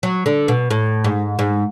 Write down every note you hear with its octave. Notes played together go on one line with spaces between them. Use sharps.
F#3
D3
B2
A2
G#2
G#2